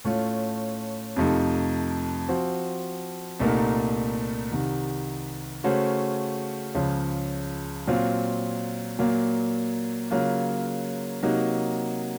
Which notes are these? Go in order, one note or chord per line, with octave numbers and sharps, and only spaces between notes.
A2 A3 C#4 F4
F2 C3 F3 A3 D#4
F3 C4 F#4
C2 A#2 A3 D#4 A#4
C2 C3 D#3
C#3 A3 C#4 F#4 C5
C#2 C#3 F3
A#2 F#3 C4 F4
A#2 F#3 A#3
C#3 F#3 A#3 F4
C3 F#3 A#3 D#4 F#4